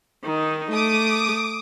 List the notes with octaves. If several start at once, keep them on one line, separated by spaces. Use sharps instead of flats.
D#3 D#4
A3 D6 D#6